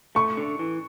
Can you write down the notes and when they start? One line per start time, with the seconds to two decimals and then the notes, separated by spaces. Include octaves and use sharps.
0.15 A3 C#6
0.37 D3
0.59 E3